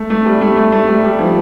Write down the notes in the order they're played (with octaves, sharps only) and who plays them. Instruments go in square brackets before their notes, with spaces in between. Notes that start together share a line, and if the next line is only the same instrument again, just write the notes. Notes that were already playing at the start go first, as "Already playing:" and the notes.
Already playing: [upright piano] A3
A3
G3
A3
A3
A3
G3
G3
F3